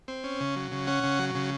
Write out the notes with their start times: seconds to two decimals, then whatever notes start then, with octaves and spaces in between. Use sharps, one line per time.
0.08 C4
0.24 C#4
0.40 C#3
0.56 F#3
0.72 C#3
0.87 C#4 F#5
1.03 C#3
1.19 F#3
1.35 C#3